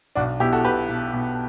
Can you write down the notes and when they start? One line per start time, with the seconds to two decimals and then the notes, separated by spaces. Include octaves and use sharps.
0.15 B1 D4 F#4
0.40 B2 E4 G4
0.53 F#4 A4
0.64 B2 G4 B4
0.89 B2
1.13 B2